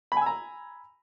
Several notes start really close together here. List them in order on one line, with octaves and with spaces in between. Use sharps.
B5 G#5 E6 A#5